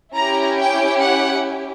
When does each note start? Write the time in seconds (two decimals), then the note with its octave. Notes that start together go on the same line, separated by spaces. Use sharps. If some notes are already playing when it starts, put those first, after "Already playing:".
0.15 C#4 E4 G4 A#5
0.59 G5
1.02 F#5